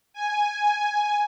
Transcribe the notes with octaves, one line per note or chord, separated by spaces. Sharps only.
G#5